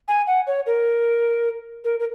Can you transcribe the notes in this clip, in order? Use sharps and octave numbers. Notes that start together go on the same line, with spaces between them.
G#5
F#5
C#5
A#4
A#4
A#4